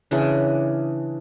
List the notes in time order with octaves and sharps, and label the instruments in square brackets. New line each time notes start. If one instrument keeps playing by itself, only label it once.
[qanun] C#3 E3 D4